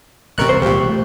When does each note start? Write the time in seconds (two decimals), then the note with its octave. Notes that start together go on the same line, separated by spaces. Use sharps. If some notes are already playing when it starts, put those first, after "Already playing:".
0.38 A1 C3 A#4 C#6 F#6
0.49 E1 C2 C5
0.62 D#2 A#2 G4
0.89 A3